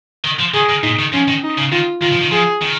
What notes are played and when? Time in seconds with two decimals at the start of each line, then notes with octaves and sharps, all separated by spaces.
0.24 D#3
0.39 F3
0.54 D#3 G#4
0.69 D#3
0.83 A#2 D#4
0.99 D#3
1.13 F3 C#4
1.28 D#3
1.44 D#4
1.58 C#3
1.72 D#3 F4
2.02 D#3 F4
2.12 F3
2.22 D#3
2.32 F3 G#4
2.62 D#3